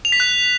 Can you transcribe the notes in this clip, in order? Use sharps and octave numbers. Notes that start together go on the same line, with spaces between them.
F7
B6
F#6